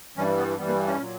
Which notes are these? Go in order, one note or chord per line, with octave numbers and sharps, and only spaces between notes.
G2 E3 G3 C#4
B3
G2 E3 G3 B3
A#3
C#4
A#2 F#3